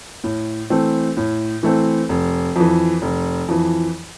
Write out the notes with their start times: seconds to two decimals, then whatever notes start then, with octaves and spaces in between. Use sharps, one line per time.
0.24 A2
0.70 E3 A3 C4
1.17 A2
1.63 E3 A3 C4
2.09 F1
2.56 F2 E3
3.02 F1
3.48 F2 E3